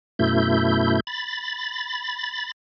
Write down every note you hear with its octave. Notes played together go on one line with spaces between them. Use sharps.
F#2 B2 A3 E4 G6
B5 A6